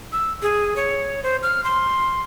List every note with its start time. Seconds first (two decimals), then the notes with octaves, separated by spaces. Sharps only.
0.13 E6
0.42 G#4
0.76 C#5
1.23 C5
1.43 F6
1.64 C6